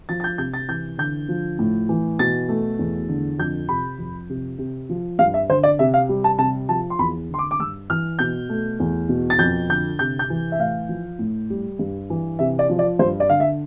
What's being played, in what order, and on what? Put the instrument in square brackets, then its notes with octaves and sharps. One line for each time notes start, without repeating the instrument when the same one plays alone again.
[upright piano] F3 A6
A6
G6
C3 G6
A6
E3 G6
D3 G6
F3
A2
E3
B2 A6
A3
E2
D3
F2 G6
C3 B5
F2
C3
C3
F3
G2 F5
E5
D3 C5
D5
C3 E5
F5
G3
A5
C3 A5
F3 A5
C6
E2 B5
D3 C6
D6
D6
G2 E6
E3 F6
B2 G6
A3
E2
B2
A6
F2 G6
D3 G6
C3 G6
G6
E3
E5
A2 F5
F3
A2
G3
G2
E3
C3 E5
D5
F3
D5
G2 C5
D5
D3 F5
E5